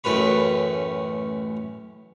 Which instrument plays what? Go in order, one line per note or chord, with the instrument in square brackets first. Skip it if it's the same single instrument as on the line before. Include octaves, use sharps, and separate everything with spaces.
[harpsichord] A1 F#2 A2 B4 B5